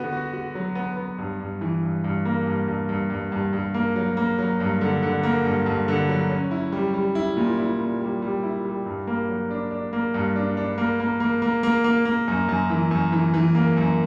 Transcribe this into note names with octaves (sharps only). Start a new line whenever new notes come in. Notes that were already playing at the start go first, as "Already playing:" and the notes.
Already playing: D3 B3 F#4
F#4
F#4
F#3
B3
B3
G2
G2
E3
G2
G2
A#3
G2
G2
G2
G2
G2
G2
A#3
F#3
A#3
F#3
G2
D3
D3
A#3
G2
G2
D3
F#3
C#4
E4
G3
G3
E4
A#2
E4
A#2
G3
G3
E4
G3
G2
A#3
F#3
D4
D4
A#3
G2
D4
D4
A#3
A#3
A#3
A#3
A#3
A#3
A#3
F#2
F#2
E3
F#2
E3
E3
A#3
F#2